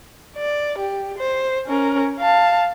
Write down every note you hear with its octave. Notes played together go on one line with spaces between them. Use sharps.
D5
G4
C5
C#4 A#4
F5 A5